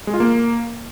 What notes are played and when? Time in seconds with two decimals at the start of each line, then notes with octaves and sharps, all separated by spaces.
0.07 G#3
0.14 F4
0.20 A#3